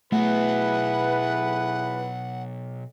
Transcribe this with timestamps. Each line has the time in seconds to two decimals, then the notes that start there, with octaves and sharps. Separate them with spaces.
0.12 B2 F#3 A3 B3 E4 G#4 B4 F#5